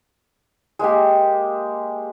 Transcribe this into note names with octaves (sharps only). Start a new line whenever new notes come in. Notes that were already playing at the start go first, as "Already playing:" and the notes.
G#3 A#3 G4